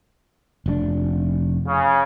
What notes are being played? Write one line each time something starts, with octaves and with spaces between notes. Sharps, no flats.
F1 A2 D4
C#3